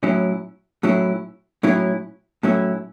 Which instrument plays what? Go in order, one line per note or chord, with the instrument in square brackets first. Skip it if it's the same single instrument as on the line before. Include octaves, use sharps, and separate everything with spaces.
[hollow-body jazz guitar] A2 F#3 C#4 E4
A2 F#3 C#4 E4
A2 F#3 C#4 E4
A2 F#3 C#4 E4